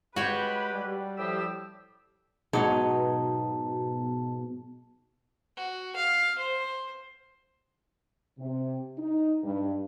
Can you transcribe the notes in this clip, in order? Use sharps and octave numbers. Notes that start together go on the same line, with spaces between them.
G#3 F#4 G4 B4 C#5 G5
G3
A2 F3 G4 E6
G#2 B2 F#3 D#4 C#5 A5
F#4
F5
C5
C3
D#4
G2